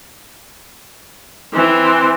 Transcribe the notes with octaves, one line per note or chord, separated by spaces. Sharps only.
E3 C4